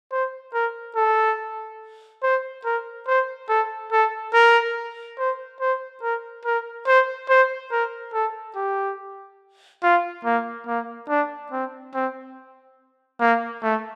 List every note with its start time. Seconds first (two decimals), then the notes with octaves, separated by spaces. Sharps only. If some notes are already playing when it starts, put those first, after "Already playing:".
0.11 C5
0.54 A#4
0.96 A4
2.23 C5
2.65 A#4
3.07 C5
3.49 A4
3.92 A4
4.34 A#4
5.18 C5
5.60 C5
6.02 A#4
6.45 A#4
6.87 C5
7.29 C5
7.72 A#4
8.14 A4
8.56 G4
9.83 F4
10.25 A#3
10.67 A#3
11.09 D4
11.52 C4
11.94 C4
13.20 A#3
13.63 A3